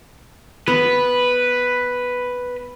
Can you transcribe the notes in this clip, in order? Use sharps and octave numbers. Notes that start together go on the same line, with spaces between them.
B3 B4